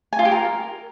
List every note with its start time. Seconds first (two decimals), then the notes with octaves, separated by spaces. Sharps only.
0.13 G#5
0.19 F4
0.25 G4
0.31 A#4